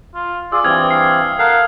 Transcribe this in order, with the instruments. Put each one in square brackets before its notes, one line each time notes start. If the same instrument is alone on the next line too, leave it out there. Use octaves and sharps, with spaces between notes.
[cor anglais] F4
[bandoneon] F4 G#4 [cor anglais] D5 [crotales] E6
[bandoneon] G2 E3 C4 [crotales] D#6 F6 G#6
[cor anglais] F5 [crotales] C7
[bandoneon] A4 A#4 A5 [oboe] F5 [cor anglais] F#5